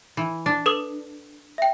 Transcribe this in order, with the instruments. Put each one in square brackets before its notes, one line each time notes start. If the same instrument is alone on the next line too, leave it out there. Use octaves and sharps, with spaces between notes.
[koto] E3
D4
[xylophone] A4 B4 D#6
E5 G5